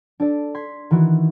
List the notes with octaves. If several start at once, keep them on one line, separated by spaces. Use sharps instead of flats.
D4 A4 D5
C6 G#6 B6
D#3 E3 F#4